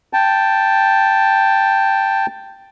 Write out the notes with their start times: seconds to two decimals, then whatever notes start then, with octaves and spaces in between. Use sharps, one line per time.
0.13 G5 A5